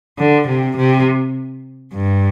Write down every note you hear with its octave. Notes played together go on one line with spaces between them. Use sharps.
D3
C3
C3
G2